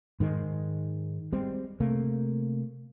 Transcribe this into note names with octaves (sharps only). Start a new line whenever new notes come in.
G#2 D#3 G#3
G3 G#3 C4
C3 A3 A#3